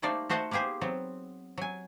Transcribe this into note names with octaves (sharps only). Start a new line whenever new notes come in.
G3 A3 A#3 D#4 C5 D5
A3 F#4 C5 D#5 F#5 A5
A#3 B3 G4 G#4 C5
F#3 B3 C4
F#3 G#5